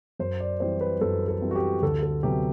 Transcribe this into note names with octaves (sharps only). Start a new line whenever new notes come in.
F#2 C5
D5
E3 G3 C4 C5
B4
F#2 A4
A4
E3 G3 C4
F#4
G4
D2 A4
A4
C3 F#3 B3 G4